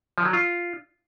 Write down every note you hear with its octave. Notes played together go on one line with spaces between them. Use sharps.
F3
F#3
F4